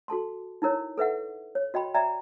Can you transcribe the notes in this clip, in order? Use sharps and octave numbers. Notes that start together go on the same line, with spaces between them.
F#4 A4 A5 C6
D#4 E4 A#4 C#5
A4 B4 E5 F#5
C#5
F#4 D#5 G5 B5 C6
D5 E5 G5 A#5